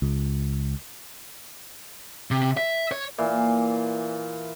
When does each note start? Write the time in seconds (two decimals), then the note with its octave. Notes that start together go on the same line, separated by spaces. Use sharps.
0.02 C#2
2.31 C3
2.57 E5
2.91 C#5
3.18 A#2 E3 F5